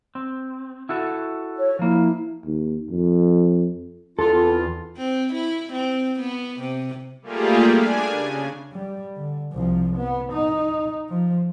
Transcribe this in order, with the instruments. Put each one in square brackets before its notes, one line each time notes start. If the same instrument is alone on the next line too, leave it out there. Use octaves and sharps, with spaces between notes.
[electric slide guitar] C4
E4 F#4 A4
[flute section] C#5
[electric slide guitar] F3 A#3 [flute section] E4
[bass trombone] D#2
F2
[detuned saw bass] E2 [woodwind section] D4 F4 [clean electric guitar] A4
[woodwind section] E3 C4 F4
[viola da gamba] C4
E4
C4
B3
C3
[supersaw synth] G3 A3 A#3 F4 G4 G#4
D4 G#5
C#3
[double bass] G3
D3
C2 F3
B3
D#4
F3